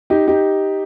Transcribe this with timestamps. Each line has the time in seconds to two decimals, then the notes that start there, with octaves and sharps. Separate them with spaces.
0.10 D#4 G4
0.27 D#4 G4